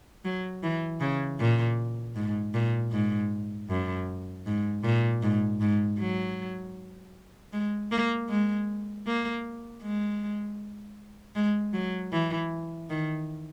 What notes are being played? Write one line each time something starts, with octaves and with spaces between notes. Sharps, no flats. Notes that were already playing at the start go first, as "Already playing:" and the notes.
F#3
E3
C#3
A#2
G#2
A#2
G#2
F#2
G#2
A#2
G#2
G#2
F#3
G#3
A#3
G#3
A#3
G#3
G#3
F#3
E3
D#3